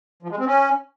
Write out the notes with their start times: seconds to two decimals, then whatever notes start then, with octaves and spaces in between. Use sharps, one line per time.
0.23 F3
0.31 G#3
0.39 C4
0.47 C#4